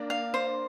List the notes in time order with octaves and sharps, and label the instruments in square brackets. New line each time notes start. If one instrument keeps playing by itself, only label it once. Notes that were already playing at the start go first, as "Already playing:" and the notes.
Already playing: [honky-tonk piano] A#3 D4
[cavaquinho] F5
C5